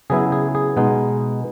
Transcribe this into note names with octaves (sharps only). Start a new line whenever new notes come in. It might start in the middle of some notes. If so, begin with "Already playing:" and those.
C#3 F#3 B3 E4 G#4
G#4
G#4
B2 G#3 B3 D#4